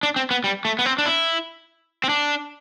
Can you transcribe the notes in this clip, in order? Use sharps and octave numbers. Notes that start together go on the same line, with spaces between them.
D4
C4
B3
G3
A3
B3
C4
D4
E4
C4
D4